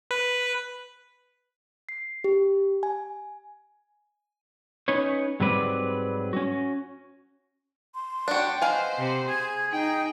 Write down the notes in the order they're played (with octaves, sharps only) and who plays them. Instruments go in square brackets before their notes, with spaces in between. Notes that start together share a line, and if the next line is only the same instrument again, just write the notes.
[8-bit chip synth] B4
[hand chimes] C7
G4
G#5
[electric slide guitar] C#4 D#4 B4 C#5
G#2 F#3 G3 C4 B4 D5
C#4 F#4
[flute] C6
[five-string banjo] D4 F#4 [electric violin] C#5 G5
[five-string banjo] B3 F5 G#5 [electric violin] C5 [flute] D#5
[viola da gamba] C3
[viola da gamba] G#4 [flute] G#6
[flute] D#4 [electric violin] G5